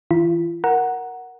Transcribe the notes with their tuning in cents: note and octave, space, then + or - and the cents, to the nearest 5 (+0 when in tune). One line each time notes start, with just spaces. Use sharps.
E3 -15 F4 -45
A#4 +0 F#5 +0 A#5 +10